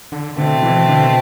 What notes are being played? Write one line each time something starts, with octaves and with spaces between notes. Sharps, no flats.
D3
B2 D3 A3 C4
E3
D3